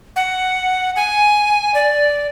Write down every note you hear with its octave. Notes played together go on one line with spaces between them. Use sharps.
F#5
G#5
D5